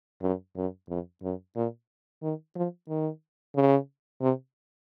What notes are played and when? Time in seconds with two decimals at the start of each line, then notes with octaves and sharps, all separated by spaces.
0.22 F#2
0.56 F#2
0.89 F2
1.23 F#2
1.56 A#2
2.23 D#3
2.56 F3
2.89 D#3
3.56 C#3
4.21 C3